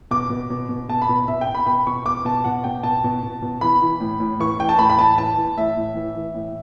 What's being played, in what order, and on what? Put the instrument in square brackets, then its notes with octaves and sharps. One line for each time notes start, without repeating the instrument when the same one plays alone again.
[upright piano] B2 D6
B2
B2
B2
B2 A5
B5
B2
B2 E5
G5
B2
B5
B2 B5
B2 C#6
B2 D6
B2 A5
B2 F#5
B2 G5
B2 A5
B2
B2
B2
E3 B5
E3
A2
A2
E3 C#6
E3 G5
A5
A2 B5
B5
A2 A5
E3 A5
E3
A2 E5
A2
E3
E3
A2